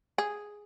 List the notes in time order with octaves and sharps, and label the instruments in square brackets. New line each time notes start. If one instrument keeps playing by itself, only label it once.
[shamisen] G#4